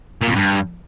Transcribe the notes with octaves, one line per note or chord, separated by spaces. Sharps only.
A#2
F2
G2